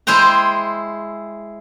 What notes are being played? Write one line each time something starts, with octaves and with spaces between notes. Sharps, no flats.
G#3 E4 C5 G5 A#5